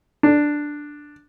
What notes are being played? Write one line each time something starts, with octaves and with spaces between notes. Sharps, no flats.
D4